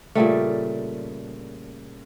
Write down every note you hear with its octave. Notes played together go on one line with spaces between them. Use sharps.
A#2 C#3 G3 A3